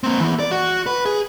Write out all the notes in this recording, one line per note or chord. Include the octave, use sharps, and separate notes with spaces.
A#3 C4
E3 B3
D5
F#4
B4
G#4